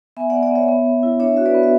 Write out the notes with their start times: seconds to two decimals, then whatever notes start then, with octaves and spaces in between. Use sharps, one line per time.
0.17 B3 E5 G#5
0.30 D5 F#5
0.34 B3
0.43 D5 F#5
0.51 B3 C#5 E5
0.68 B3
0.86 B3
1.03 E4
1.19 D4 C#5 E5
1.37 F#4 E5
1.46 B4 D5
1.55 B3
1.63 E5